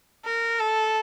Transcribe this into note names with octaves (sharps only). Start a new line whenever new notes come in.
A#4
A4